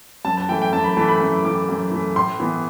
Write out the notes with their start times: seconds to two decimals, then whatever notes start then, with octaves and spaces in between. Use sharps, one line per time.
0.25 F#2 A5
0.37 A5
0.49 E3 A3 G5
0.62 G5
0.73 F#2 A5
0.84 B5
0.97 E3 A3 A5
1.08 B5
1.20 F#2
1.44 E3 A3 D6
1.69 F#2
1.91 E3 A3
2.16 A2 C6
2.40 E3 B3